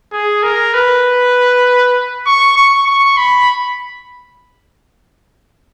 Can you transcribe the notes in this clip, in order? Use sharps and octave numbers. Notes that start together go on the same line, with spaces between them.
G#4
A#4
B4
C#6
C#6
C#6
B5